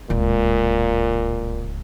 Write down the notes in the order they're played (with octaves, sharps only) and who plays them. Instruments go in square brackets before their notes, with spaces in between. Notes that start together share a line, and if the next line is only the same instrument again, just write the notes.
[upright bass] D1 C#2 [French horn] A#2